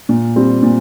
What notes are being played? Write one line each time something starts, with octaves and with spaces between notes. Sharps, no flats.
A#2
G3 C4
A#2